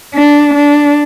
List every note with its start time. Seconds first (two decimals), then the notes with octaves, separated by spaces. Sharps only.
0.14 D4
0.54 D4